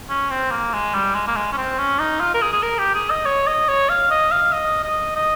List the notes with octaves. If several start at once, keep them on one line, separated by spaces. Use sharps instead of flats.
C#4
C4
A#3
G#3
G3
G#3
A#3
G#3
C#4
C4
C#4
D#4
F4
A#4
G#4
G#4
A#4
G4
G#4
D#5
C#5
D#5
C#5
F5
D#5
F5
D#5
D#5
D#5